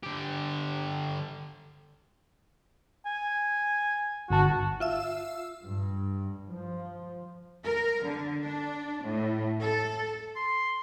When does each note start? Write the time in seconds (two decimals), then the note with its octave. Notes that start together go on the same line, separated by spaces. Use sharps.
0.03 D3 G4
3.06 G#5
4.30 G1 F#4 A5
4.80 F4 E5 E6
5.64 G2
6.49 F3
7.64 A#4
8.04 D3
8.43 D4
9.05 A2
9.61 A4
10.36 C6